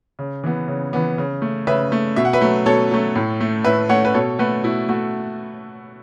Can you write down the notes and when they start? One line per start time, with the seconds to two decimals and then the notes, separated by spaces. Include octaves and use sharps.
0.19 C#3
0.44 E3 B3
0.68 C#3
0.93 E3 B3
1.18 C#3
1.42 A3
1.67 C#3 B4 E5
1.92 A3
2.16 B2 E5
2.25 F#5
2.33 B4 E5
2.41 F#3 A3
2.66 B2 A4 C#5
2.91 F#3 A3
3.15 A2
3.40 A3
3.64 A2 B4 E5
3.89 A3 C#5 F#5
4.05 B4
4.14 B2 A4 C#5
4.39 A3 F#4 B4
4.64 B2 E4
4.89 A3 F#4